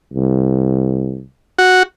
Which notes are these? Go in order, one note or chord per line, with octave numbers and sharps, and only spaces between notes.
C2
F#4